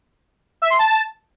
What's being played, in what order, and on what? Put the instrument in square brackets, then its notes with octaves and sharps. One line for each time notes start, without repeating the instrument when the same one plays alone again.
[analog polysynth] E5
C6
A5